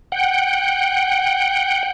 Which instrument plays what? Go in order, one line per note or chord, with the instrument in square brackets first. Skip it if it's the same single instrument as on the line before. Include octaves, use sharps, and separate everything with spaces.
[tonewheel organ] F#5 G5